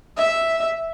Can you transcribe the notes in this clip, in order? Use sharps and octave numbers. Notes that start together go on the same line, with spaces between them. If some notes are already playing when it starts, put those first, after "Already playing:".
E5